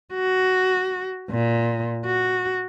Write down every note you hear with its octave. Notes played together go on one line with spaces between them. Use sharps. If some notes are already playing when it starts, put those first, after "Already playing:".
F#4
A#2
F#4